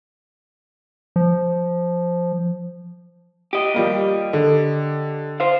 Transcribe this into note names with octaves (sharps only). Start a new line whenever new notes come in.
F3
G4 D#5
F3 G3 A#3
D3
C5 F5